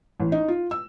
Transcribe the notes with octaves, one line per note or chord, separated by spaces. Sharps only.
A1
D#4
F4
E6